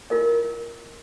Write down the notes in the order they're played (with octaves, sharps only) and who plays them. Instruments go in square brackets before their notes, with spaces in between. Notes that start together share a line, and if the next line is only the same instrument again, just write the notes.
[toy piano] E4 F4 A#4 D#5